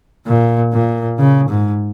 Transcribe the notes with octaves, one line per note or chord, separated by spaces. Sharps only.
A#2
A#2
C#3
G#2